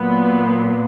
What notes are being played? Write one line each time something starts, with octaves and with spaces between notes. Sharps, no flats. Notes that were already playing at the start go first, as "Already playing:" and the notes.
Already playing: A#2 F#3 B3